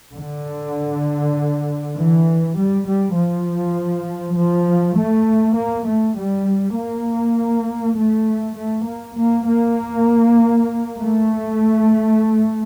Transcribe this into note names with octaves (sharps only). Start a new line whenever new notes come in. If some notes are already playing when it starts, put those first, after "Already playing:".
D3
E3
G3
G3
F3
F3
A3
A#3
A3
G3
A#3
A3
A3
A#3
A#3
A#3
A3